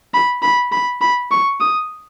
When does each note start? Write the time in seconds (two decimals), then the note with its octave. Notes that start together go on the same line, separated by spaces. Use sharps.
0.14 B5
0.42 B5
0.72 B5
1.01 B5
1.31 C#6
1.60 D#6